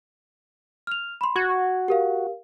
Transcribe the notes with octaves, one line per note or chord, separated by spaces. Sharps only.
F6 F7
B5 C6
F#4 C#6 G#6
G4 A#4 F5